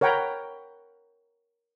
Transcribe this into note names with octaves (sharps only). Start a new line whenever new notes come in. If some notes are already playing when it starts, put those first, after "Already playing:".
A#4 C#5 F#5 G5 A#5 B5